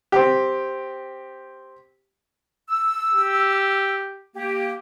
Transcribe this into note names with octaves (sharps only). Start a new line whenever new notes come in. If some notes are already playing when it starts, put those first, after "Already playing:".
C4 G4
E6
G4
A#3 G4